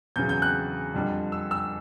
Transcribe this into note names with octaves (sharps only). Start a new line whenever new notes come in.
E2 C#3 F#3 G6
G6
F#6
F2 D3 G3
E6
E6